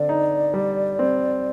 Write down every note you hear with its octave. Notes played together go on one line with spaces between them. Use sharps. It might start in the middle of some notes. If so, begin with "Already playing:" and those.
Already playing: D3 C4 D5
D#4
G3
C4